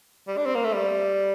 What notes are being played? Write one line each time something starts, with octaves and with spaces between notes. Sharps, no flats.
G3
D4
C4
A#3
A3
G3